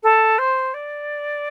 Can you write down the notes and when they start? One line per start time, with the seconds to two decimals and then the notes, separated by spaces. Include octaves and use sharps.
0.03 A4
0.38 C5
0.74 D5